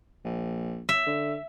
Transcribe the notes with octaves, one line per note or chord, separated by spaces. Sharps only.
A#1
E5
D3